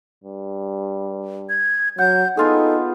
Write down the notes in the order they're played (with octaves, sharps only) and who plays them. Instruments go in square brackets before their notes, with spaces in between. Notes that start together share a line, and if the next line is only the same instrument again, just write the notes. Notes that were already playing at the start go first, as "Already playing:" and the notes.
[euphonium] G2
[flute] G#6
[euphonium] F#3 [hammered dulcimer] F#5 [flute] G6
[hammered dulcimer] B3 F4 G#4 [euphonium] D#4 [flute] A4